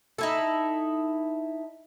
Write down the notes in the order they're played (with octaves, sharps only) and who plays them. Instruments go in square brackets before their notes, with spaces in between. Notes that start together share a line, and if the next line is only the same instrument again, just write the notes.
[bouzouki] D#4 E4 A4